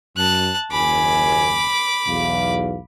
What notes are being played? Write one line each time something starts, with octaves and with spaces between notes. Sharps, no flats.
F#2 A5 F#6
F#1 D#2 G#5 B5 D6
B1 E2 F5